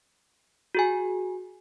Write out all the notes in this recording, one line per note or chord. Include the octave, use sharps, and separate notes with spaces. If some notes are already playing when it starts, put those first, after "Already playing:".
F#4 G#4 G#5